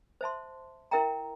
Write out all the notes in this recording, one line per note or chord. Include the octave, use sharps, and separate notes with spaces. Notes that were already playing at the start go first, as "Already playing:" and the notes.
C5 E5 A5 C6
E4 A#4 E5 G5 A#5